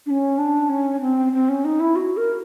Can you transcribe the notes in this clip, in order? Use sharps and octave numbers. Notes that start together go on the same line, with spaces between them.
D4
C#4
D4
C#4
C4
C4
C#4
D#4
E4
F#4
A#4